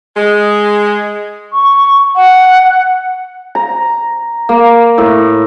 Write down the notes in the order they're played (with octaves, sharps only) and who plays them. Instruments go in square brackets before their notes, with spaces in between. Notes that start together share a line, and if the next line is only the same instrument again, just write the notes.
[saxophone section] G#3
[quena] C#6
F#5
[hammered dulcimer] A#5
A#3
A2